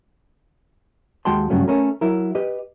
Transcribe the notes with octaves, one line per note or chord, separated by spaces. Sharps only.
D#2 G#3 F#4 G5 A5 C6
G2 C#3 F#3 A3 C#4
A3 C#4 A#4
F#3 E4 A#4
G4 B4 D#5